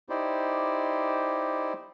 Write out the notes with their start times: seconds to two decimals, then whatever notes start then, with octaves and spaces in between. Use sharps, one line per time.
0.09 D#4 E4 G4 C5 D5